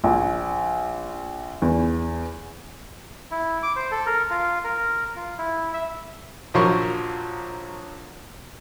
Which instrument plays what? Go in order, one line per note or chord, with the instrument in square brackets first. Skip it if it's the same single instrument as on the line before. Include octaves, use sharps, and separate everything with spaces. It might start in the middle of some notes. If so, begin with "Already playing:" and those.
[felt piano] A#1
E2
[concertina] E4
D6
C5
A4
A#4
F4
A#4
F4
E4
E5
[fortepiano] A#1 F3 F#3 A#4 C6 C#6